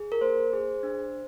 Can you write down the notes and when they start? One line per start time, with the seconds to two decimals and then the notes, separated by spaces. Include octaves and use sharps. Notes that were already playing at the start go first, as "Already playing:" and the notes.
Already playing: G#4
0.12 A#4
0.21 A#3 C5
0.53 G#4
0.83 D4